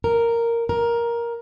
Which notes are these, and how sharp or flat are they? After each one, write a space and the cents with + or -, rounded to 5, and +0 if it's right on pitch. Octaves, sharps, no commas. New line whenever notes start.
A#4 -5
A#4 +10